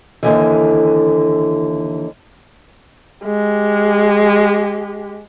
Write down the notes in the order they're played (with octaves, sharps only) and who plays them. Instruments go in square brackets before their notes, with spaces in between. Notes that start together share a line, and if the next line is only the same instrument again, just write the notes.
[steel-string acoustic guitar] D#2 D3 E3
[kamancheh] G#3 G4